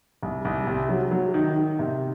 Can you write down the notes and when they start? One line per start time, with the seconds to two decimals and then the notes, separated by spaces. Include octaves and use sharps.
0.23 C2
0.45 C2
0.67 C3
0.89 F#3
1.11 F#3
1.34 D#3
1.56 D#3
1.79 C3